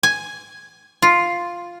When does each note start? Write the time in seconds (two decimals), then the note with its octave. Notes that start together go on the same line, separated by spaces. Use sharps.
0.03 G#5
1.02 F4